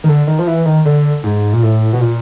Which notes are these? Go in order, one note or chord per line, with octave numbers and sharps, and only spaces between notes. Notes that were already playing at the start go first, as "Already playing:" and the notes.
D#3
D3
D#3
F3
E3
D#3
D3
G#2
A#2
A2
B2
A#2